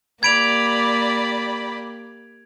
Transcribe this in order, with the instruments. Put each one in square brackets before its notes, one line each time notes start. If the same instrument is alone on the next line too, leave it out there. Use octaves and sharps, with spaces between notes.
[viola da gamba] A#3 G4 [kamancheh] D5 B5 [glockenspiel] G#6 D7 F7